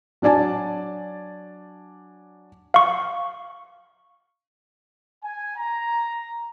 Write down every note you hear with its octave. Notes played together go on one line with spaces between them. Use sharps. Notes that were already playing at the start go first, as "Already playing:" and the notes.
F#3 D4 D5 G#5 A5
F5 C#6
G#5
A#5